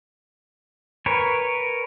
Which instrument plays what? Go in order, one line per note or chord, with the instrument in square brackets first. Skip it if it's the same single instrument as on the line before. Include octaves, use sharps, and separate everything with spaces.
[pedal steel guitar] A#4 B4 C#5 G#5